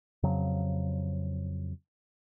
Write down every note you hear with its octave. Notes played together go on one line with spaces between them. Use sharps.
F2 C#3 F#3